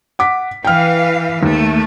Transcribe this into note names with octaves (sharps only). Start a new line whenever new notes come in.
F#5 D6 B6
E3 B4 F5 G5 F6
D#2 A3